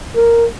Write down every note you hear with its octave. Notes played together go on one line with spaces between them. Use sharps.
A#4